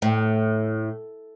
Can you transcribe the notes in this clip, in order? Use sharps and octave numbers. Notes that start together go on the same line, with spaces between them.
A2